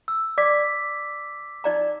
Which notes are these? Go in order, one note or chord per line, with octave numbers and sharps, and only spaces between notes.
E6
D5 D6 B6
D#4 D5 A#5